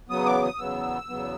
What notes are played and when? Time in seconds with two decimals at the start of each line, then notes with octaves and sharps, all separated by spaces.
0.09 E2 C#3 F#3 B3 D#6
0.26 D6
0.43 D#6
0.58 E2 C#3 F#3 B3 E6
1.09 E2 C#3 F#3 B3